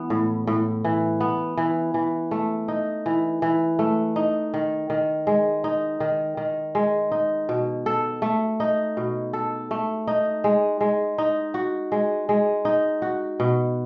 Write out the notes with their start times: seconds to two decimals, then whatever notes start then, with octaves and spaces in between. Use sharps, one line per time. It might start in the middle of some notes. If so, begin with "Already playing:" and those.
Already playing: E3 B3
0.10 A2
0.47 A2
0.84 E3
1.20 B3
1.57 E3
1.94 E3
2.31 A3
2.68 D#4
3.06 E3
3.42 E3
3.79 A3
4.16 D#4
4.54 D#3
4.90 D#3
5.27 G#3
5.64 D#4
6.00 D#3
6.37 D#3
6.75 G#3
7.12 D#4
7.49 B2
7.86 A4
8.22 A3
8.60 D#4
8.97 B2
9.33 A4
9.71 A3
10.07 D#4
10.44 G#3
10.81 G#3
11.18 D#4
11.54 F#4
11.92 G#3
12.29 G#3
12.65 D#4
13.02 F#4
13.40 B2